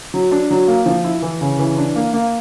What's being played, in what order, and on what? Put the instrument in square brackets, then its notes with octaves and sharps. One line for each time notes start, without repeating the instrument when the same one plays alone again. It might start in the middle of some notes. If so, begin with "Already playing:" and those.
[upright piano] F#3
D4
F#3
A#3
F3
E4
E3
C#3
E3
D4
A#3
A#3